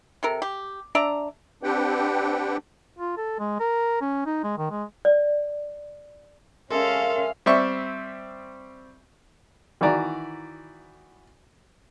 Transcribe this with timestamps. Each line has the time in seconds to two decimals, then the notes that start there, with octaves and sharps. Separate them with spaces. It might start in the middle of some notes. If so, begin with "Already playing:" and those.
0.23 C3 A4 A#4
0.42 G4
0.95 D4 D5 E5 A#5
1.63 C4 D4 G4 B4 F#5 G5
2.99 F4
3.17 A4
3.39 G#3
3.60 A#4
4.01 C#4
4.26 D#4
4.44 G#3
4.58 D#3
4.71 G#3
5.05 D5
6.71 G#3 C#4 A4 A#4 E5 F5 C6
7.46 G3 C4 E5 C#6
9.81 D#3 E3 E4 F#4 D5 A#5